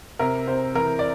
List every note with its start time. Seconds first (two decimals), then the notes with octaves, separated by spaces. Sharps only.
0.19 C3 A#4
0.47 C3 C5
0.75 E3 A#4
0.99 D5